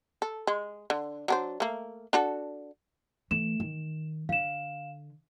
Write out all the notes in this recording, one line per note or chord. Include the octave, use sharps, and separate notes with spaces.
A4
G#3
D3
F#3 D4 C5
A3 A#3
D4 F#4 A4
E3 A3 E7
D#3
D3 F5 E7